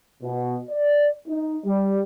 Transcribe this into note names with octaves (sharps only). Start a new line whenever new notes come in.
B2
D5
D#4
G3